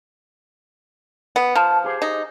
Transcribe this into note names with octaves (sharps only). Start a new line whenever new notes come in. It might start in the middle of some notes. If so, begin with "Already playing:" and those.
B3
F3 A5
G4 G#4 C5
D#4